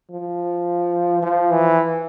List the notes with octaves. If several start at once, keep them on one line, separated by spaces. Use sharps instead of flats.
F3
F3
E3